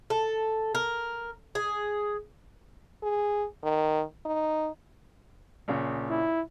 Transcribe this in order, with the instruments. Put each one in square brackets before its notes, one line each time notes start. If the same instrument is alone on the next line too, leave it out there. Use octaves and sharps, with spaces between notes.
[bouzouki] A4
A#4
G#4
[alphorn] G#4
D#3
D#4
[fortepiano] A#1 C#3
[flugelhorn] E4